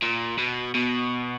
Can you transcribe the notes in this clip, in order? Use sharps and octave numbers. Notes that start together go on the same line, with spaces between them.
A#2
B2
B2